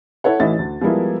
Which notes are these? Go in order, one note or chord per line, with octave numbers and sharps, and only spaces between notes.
E4 A4 C#5 F#5
A1 A2 E3 D#4 E5 A6
D2
F3 G3 G#3 B3 E4 A#4